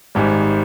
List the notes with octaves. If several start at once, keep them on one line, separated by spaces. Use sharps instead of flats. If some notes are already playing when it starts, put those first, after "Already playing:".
G#1 G#2 G3